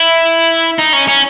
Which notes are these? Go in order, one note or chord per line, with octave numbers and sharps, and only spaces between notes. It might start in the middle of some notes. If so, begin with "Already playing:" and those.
Already playing: E4
D#4
C#4
C#4